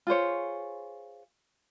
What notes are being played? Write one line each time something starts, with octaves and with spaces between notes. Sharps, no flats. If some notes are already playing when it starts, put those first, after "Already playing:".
F4 G#4 C5 C#5